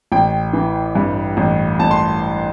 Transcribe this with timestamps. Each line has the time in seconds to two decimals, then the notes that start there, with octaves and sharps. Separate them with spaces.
0.12 A1 G5
0.53 E3
0.95 G2
1.37 A1
1.79 A1 A5
1.91 C6